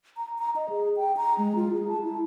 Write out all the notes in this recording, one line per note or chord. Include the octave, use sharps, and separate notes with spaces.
A#5
A#5
D#5
G#4
G5
A#5
G#3
F4
G#4
A5
E4